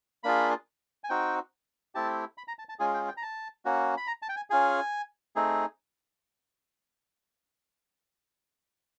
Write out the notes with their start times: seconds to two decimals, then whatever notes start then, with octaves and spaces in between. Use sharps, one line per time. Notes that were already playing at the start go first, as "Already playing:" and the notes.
0.23 A#3 D4 F4 G#4 B5
1.04 G#5
1.09 C4 D#4 F#4 G5
1.95 A3 C4 E4 G4 A5
2.38 B5
2.48 A#5
2.59 A5
2.69 A5
2.79 G#3 C#4 F4 G#4 G#5
2.94 G5
3.08 G5
3.17 A#5
3.22 A5
3.65 A#3 C#4 F#4
3.97 B5
4.07 A#5
4.22 A5
4.29 G5
4.36 G#5
4.50 C#4 F4 G#4 G#5
5.36 A3 C4 D#4 G#4